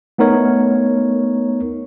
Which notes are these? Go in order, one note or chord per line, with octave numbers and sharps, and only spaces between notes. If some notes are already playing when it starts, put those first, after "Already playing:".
A3 B3 D#4 A#4 C#5